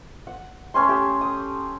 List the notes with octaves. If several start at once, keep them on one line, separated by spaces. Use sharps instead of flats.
F#5
A3 C#4 G#5 C6
G4 E5
D#6